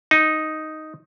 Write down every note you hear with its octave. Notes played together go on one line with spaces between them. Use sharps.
D#4